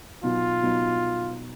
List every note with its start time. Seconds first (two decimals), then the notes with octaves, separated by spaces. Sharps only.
0.23 B2 F#3 B3 D#4 F4
0.62 B2 F#3 B3 D#4